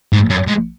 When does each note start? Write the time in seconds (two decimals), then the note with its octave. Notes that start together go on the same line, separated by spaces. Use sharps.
0.13 G#2
0.30 F#2
0.47 G#2